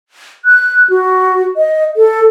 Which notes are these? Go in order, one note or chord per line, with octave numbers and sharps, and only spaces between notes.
F#6
F#4
D#5
A4